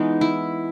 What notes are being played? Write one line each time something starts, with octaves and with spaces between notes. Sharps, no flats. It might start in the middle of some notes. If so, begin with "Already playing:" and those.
Already playing: E3 G#3 B3 D#4
E4